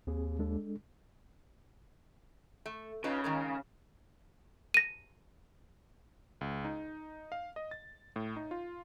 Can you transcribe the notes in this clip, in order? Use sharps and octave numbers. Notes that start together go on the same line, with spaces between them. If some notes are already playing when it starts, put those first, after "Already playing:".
D#2 C4 G#4
G#3 D4 A4
A3
C#3 D#4 F4 B4
D#3 G#3 A#4
A#6 D#7
C#2
D#4
F5
D#5
A6
A2
D#4
F4